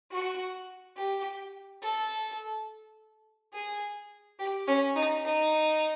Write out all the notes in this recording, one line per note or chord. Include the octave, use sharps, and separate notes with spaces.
F#4
G4
A4
G#4
G4
C#4
D#4
D#4